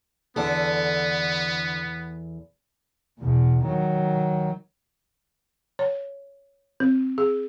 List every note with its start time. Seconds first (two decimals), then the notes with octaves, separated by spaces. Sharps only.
0.36 E2 D3 B3 A4
3.19 E2 B2
3.64 D#3 F#3
5.79 C#5
6.80 C4
7.18 G#4